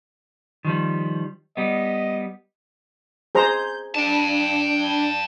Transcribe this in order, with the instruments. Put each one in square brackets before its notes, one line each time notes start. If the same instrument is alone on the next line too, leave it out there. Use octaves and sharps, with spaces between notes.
[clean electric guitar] D#3 F3 G3
[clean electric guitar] G3 B3 [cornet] D#5
[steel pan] G#4 C5 A#5 [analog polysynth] G6
[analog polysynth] D4 [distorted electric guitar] G5 A5